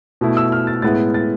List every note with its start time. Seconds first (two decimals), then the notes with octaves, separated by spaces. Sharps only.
0.21 B2 A3 E4
0.37 E6
0.52 F6
0.67 A6
0.82 A2 G#3 B3 E4 A6
1.14 A6